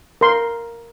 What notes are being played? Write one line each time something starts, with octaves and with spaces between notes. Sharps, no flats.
A#4 C6